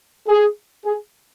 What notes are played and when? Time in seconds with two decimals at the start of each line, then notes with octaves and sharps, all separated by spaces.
0.28 G#4
0.85 G#4